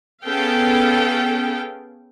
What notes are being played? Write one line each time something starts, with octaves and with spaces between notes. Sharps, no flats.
B3 C#4 G#4 A4 F5 G5